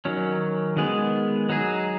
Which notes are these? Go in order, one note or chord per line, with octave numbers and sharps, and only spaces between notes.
D#3 F#3 C#4
D#3 G#3 B3 G#4
F#3 D#4 G#4